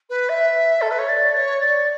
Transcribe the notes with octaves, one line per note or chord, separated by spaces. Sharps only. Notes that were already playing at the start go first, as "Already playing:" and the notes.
B4
E5
A4
B4
C#5
D5
C#5
D5